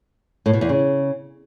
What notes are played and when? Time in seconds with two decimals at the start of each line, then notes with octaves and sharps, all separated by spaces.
0.46 A2
0.53 B2
0.61 E2
0.69 C#3